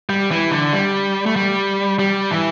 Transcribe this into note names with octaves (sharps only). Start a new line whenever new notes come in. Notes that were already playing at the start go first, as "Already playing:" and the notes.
G3
E3
D3
G3
A3
G3
G3
E3